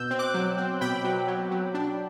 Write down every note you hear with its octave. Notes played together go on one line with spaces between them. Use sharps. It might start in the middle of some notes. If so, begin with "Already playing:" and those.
Already playing: B2 E6 G6
C4
D6 F#6
F#3
C4
B2 G5 B5
F#3
F#3
F#3
D4